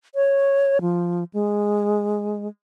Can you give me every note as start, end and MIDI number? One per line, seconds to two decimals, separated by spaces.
0.15 0.81 73
0.81 1.24 53
1.33 2.48 56